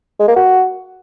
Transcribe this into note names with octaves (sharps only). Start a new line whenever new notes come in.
G#3
A#3
F#4